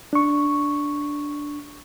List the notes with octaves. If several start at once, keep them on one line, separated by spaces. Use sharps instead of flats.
D4 C#6